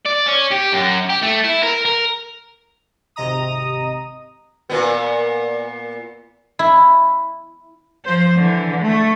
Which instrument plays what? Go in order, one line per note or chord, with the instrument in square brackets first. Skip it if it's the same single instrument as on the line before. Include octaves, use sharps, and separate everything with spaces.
[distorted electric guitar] D5
C#4
G4
F#2
G4
A3
E4
A#4
A#4
[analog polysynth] G#1 C3 D#5 A#5 D#6
[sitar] A#2 B3
[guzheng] E4
[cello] F3 C5
D3 E3
A3